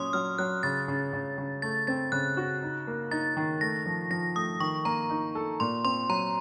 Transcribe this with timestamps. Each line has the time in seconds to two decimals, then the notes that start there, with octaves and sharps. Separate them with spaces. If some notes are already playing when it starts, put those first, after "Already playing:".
Already playing: A#2 F#3 C#4 C6 D#6
0.13 F#3 F6
0.38 F#3 F#6
0.63 C#3 A6
0.88 C#3
1.13 C#3
1.38 C#3
1.62 A3 A6
1.87 C4 A6
2.12 C#3 F#6
2.37 F#4
2.62 D#4
2.87 A#3
3.11 D#4 A6
3.37 D#3
3.61 A3 A#6
3.86 F3
4.10 F3 A#6
4.35 A3 D#6
4.60 D#3 C#6
4.85 A#3 A#5
5.10 D#4
5.35 A4
5.60 A#2 C6
5.85 C4 C6
6.09 F#3 A#5